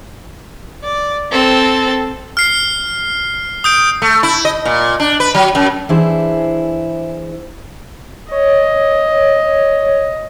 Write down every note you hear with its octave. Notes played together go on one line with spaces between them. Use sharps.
D5
C4 A4
F6 C7
D#6 G6 D7
A3
E4
D#5
A#2
D4
B4
F#3
F#2
E3 D4 E4 G#4 C5
C#5 D#5